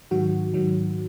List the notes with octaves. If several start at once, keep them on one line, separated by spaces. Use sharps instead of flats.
G#2 D#3 F#3 F#4
G#2 D#3 F#3